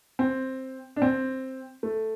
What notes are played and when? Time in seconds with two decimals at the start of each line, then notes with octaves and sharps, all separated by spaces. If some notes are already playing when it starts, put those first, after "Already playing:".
0.19 C4
0.96 D4
1.02 C4
1.83 A3